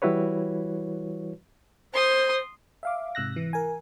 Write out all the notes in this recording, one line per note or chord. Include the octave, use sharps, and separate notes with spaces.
E3 G3 E4 F#4 B4 C#5
C5 C6 D#6
E5 F5 D6
G#2 C3 E6 F#6 A#6
E3
A#4 G#5